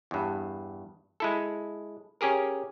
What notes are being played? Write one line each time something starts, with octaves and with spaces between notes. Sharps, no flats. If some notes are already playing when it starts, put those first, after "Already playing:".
E2 G2
G#3 E4 A4
C#4 G4 G#4 A#4